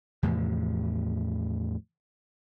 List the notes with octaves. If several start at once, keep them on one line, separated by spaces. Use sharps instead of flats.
E2 A2 C3 F3